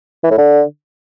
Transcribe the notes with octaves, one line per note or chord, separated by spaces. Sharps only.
E3
A2
D3